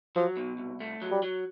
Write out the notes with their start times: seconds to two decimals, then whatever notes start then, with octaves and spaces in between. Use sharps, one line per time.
0.16 F3 F#3
0.37 B2
0.58 C2
0.80 A3
1.02 F#3
1.11 G3
1.23 F#3